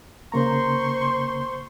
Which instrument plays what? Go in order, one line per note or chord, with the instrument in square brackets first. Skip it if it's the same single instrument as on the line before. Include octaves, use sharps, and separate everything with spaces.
[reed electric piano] C#3 A#3 A#5 [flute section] C5 C6 C#6